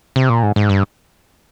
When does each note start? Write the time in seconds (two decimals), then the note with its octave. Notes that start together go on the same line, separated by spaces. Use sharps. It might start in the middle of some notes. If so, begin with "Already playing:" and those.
0.16 C3
0.29 A#2
0.43 G#2
0.56 G#2
0.69 G2